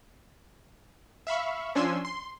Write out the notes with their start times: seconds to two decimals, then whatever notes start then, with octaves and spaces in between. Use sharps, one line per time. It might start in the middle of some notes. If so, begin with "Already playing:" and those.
1.27 E5 F5 B5 C#6
1.75 F3 C#4 D4 G#5 C6 E6
2.05 C6